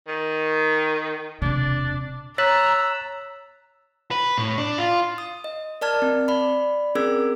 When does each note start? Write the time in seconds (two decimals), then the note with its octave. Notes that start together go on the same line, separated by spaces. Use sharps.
0.08 D#3
1.42 E1 C3 D4
2.38 C#5 A#5 E6 F#6 A6 B6
4.11 B4
4.38 A2
4.58 D4
4.78 F4
5.18 D#6
5.44 D#5
5.81 A#4 D5 A5 F6 G#6
6.02 C4
6.28 D5 B5
6.95 C4 C#4 G#4 A#4 E6 G#6